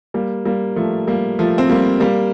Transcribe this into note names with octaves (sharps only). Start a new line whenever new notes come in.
G3 A#3
G3 A#3
F3 A3
G3 A#3
F3 A3
C4
G3 A#3
G3 A#3